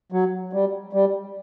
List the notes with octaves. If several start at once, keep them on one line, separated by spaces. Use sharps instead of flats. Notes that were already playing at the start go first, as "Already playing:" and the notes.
F#3
G3
G3